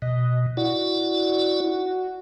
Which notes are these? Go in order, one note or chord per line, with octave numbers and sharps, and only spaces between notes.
B2 D#5
E4 F#4 D5